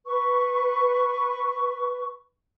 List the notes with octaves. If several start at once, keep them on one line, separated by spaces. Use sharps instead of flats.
B4 C#6